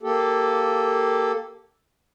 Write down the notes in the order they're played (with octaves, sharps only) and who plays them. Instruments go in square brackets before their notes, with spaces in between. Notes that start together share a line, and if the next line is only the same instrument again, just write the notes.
[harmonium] A#3 G4 A4